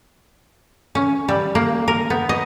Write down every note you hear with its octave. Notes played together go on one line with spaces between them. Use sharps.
C#4
G3
A#3
A#4
B3
D#5